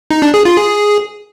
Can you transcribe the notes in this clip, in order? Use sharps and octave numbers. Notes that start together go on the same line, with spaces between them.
D#4
D4
G#4
F4
G#4